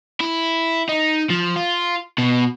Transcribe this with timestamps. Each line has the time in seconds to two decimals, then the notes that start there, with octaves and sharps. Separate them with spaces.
0.20 E4
0.89 D#4
1.30 F3
1.56 F4
2.18 B2